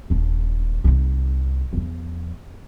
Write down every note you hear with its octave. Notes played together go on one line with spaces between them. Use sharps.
D#1 D4
C2 D#4
E2 F3